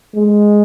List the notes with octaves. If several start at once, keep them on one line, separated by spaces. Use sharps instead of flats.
G#3